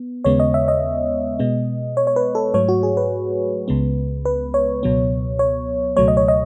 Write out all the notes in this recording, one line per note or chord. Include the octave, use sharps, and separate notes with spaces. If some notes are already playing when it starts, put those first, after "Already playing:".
Already playing: B3
D#2 C#3 G#3 B3 C#5
D#5
E5
D#5
B2 G#3 B3
C#5
C#5
B4
A4
G#2 F#3 A3 C#5
F#4
G#4
B4
C#2 C#3 G#3 B3
B4
C#5
C#2 B2 F#3 B3
C#5
C#2 B2 F#3 A3 C#5
D#5
C#5
D#5